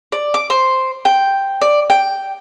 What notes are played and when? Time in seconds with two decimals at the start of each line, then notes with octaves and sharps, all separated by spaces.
0.12 D5
0.34 D6
0.50 C5
1.05 G5
1.61 D5
1.90 G5